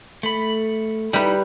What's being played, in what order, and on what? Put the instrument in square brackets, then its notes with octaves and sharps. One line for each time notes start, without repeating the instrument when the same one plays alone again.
[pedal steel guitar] A3 B5
[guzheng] G3 B4 [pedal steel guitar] D#4 E4